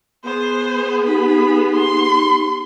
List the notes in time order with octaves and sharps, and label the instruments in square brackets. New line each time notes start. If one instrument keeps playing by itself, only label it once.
[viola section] B3 G#4 [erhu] C5
[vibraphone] D#4 G4 [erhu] B5
[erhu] C6